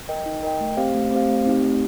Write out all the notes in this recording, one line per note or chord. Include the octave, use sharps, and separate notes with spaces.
A#4 D#5 G5
D#4
A#4 D#5 G5
A3
C4 G4 C5 F5
A3
C4 G4 C5 F5
A3
C4 D#4 G4
A3